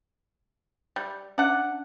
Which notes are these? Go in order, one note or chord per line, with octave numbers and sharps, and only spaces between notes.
G3 G5
C#4 D4 D5 F#5 A5